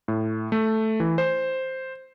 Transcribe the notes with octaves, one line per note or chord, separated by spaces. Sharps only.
A2
A3
E3
C5